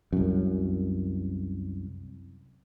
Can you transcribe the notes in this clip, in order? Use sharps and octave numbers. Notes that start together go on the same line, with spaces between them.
C2 F#2